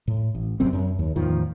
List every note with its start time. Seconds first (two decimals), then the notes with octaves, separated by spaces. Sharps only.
0.08 A2
0.35 A1
0.60 G#1 F#2 C3 C4
0.73 F#2
0.99 D#2
1.16 E2 A2 D#3 F3